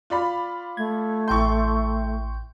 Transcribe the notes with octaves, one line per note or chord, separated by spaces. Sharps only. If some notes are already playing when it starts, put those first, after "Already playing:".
F4 D5 B5
A3 G#6
A1 G5 C6 C#6 G6